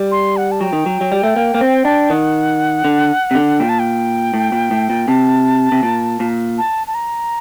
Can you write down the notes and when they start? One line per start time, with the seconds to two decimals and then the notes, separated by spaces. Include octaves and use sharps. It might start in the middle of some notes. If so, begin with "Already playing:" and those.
Already playing: G3
0.12 C6
0.37 F#5
0.52 A5
0.61 F#3 G5
0.73 D#3
0.86 F#3
1.01 F#3
1.12 G3
1.24 A3
1.36 A#3
1.55 A#3
1.61 C4
1.85 D4
2.10 D#3 F#5
2.85 D3
3.31 C3
3.35 D3
3.59 A#2 G5
3.69 A5
3.79 G5
4.34 A2
4.52 A#2
4.71 A2
4.90 A#2
5.08 C3 A5
5.72 C3
5.83 A#2
6.20 A#2
6.58 A5
6.87 A5
6.94 A#5